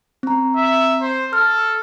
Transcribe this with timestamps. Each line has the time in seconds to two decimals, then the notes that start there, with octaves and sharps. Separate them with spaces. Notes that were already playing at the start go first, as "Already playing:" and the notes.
0.23 C4 A#5
0.56 E5
1.02 C5
1.33 A4 F6